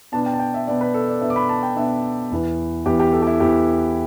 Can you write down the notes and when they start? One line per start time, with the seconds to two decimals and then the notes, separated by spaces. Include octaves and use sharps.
0.12 B2 B3 D4 A5
0.26 G5
0.34 A5
0.40 G5
0.54 E5
0.67 B2 B3 D4 D5
0.81 B4
0.94 A4
1.08 D5
1.21 B2 B3 D4 E5
1.30 D6
1.36 B5
1.49 A5
1.63 G5
1.76 B2 B3 D4 E5
2.31 E2 E3 B3
2.85 E2 E3 B3 G4
2.99 G4
3.13 A4
3.22 G4
3.27 E4
3.40 E2 E3 B3 G4